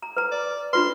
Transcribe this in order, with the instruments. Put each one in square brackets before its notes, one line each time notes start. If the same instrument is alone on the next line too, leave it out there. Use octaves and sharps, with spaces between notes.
[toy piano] A#5
B4 A#5
[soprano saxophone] D5
[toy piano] D4 F4 B4 [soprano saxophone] C6